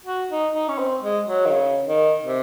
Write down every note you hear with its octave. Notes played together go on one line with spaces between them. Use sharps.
F#4
D#4
D#4
C#4
C4
G#3
F#3
D#3
C#3
D#3
C3